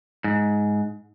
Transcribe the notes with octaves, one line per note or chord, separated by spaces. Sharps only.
G#2